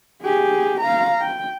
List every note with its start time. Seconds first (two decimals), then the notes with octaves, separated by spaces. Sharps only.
0.22 G4 G#4
0.81 F5 A#5
1.21 G5